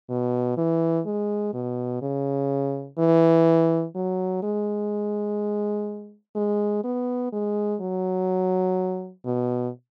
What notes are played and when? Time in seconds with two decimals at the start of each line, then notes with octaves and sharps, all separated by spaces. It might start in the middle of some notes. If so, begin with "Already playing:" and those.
0.09 B2
0.57 E3
1.06 G#3
1.53 B2
2.02 C#3
2.98 E3
3.95 F#3
4.43 G#3
6.36 G#3
6.84 B3
7.32 G#3
7.81 F#3
9.25 B2